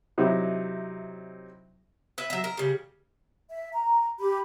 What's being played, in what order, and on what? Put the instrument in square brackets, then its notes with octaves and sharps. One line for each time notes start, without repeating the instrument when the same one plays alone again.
[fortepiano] C3 F#3 D#4 E4
[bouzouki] B4 E5
F#3 E5
A#4
C#3 G3
[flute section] E5
A#5
G4 B5